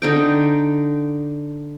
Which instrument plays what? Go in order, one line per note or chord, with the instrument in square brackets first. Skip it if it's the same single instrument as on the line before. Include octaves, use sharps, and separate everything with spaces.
[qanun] D3 D#4 G5